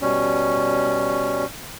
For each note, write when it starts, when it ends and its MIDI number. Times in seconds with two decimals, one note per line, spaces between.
0.02 1.45 47
0.02 1.45 55
0.02 1.45 61